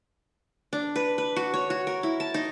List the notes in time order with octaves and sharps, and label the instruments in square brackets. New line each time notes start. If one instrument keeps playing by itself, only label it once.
[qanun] D4
B4
B4
F#4
C#5
F#4
A#4
E4
A5
D#4